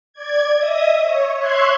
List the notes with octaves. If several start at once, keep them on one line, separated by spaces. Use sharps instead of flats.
D5 G#6
D#5 E5 D#6
C#5
C#5 E5 C6 C#6 F#6 G#6